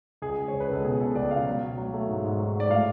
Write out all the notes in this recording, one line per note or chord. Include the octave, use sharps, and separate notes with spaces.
C#2 G#4
G#3
C#5
C#2
B4
C#2 A4
B2 G#4
B2 A4
C#2 D5
B2 F5
F#3
F#3
F#3
A3
G#2
G#2
F#3
G#2 D5
A2 F5